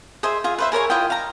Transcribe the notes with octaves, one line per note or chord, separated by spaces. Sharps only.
G#4 C5 D#5 E5
F4 G#4
B4 C5 E5
G#4 A#4 C#5 G#5
E4 F4 D#5 G5
F5 A#5